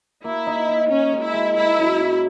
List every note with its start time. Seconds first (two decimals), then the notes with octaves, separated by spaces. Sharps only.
0.24 A#3 E4
0.47 D#4
0.69 D#4
0.90 C#4 D#4
1.13 G#3
1.23 E4
1.34 G#3
1.56 A#3 E4
1.78 F#2
2.00 F#2